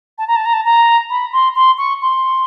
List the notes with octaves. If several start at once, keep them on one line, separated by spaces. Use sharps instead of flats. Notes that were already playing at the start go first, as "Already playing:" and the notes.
A5
A#5
A5
A#5
A5
A#5
B5
C6
C6
C#6
C6